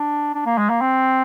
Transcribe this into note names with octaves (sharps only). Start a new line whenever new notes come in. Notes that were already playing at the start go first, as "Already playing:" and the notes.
Already playing: D4
D4
A#3
G#3
A#3
C4